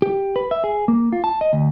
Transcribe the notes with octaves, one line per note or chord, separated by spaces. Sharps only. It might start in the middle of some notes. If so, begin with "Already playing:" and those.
G4
B4
E5
G#4
A#3
F4
A5
D#5
D2